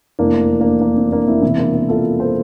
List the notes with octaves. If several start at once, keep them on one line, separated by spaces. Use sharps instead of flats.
F1 E2 E3 A#3 D4
A#3 D4
A#3
C4
A#3 D4
C4 E4
E1 E2 C3 E3 C4 E4
A#3 D4
A#3 D4
F4 A4
A4 C5